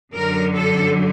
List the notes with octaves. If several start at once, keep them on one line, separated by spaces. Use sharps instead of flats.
F#2 D3 F#3 A#4
A4